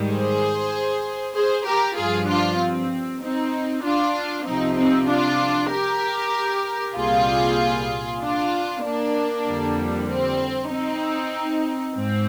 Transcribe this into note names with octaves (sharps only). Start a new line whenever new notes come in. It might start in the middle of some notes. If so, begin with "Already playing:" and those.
Already playing: G#2 D#3 G3
G#4 C5
G#4 C5
G4 A#4
G2 F3 F4 G#4
D4 F4
C4
C4 D#4
D4 F4
C2 C3 F3 C4 D#4
C4 D#4
D4 F4
G4 A#4
C2 A#2 G3 F4 G#4
D4 F4
A#3 D4
F2 D3 G3
C4
C4 D#4
G#2 C4